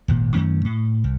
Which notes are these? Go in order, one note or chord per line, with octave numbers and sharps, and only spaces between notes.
D#1 G#1 A#2
F#2 D#3 A3 C#4
A2
C2